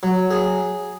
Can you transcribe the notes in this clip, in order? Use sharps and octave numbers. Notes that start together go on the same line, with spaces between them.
F#3
G#4